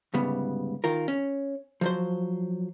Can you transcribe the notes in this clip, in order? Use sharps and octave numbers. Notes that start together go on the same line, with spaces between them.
D2 G#2 C#3 G3 B3
D#3 F4 A#4
C#4
F3 F#3 C5